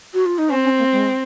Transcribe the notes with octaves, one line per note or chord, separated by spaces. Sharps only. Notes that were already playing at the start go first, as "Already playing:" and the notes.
F#4
F4
D#4
C4 C#4
C#4
A#3
G#3